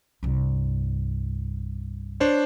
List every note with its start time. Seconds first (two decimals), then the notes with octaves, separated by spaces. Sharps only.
0.23 C2 G2
2.20 D4 C5 C#5